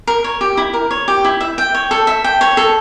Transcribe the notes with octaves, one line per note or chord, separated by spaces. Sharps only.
A#4
C#5
G4
E4
A#4
C#5
G4
E4
E5
G5
C#5
A4
E5
G5
C#5
A4